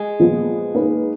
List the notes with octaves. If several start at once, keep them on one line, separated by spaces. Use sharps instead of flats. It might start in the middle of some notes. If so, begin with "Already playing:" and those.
Already playing: G#3
A#2 F3 B3
A#3 D#4 G#4 B4